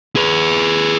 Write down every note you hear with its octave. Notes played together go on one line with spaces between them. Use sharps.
G#4 B4